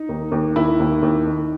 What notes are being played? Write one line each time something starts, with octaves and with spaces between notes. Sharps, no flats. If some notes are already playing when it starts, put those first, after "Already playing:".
Already playing: D#4
D#2
D#2
D#2 E4
D#2
D#2
D#3